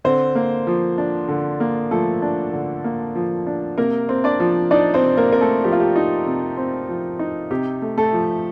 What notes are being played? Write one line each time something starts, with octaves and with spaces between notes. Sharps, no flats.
D3 C4 C5
A#3
F3
D4
D3
A#3
F3 A3 A4
D4
D3
A#3
F3
D4
C3 A#3 A#4
C4
D4 D5
F3
D4 D#4 D5
C4 C5
C3
A#3 A#4
C4 A#4
A3 A4
F3 G4
F4
G4
D#4
C3
C4
F3
D#4
C3 G4
A3
A3 A4
F3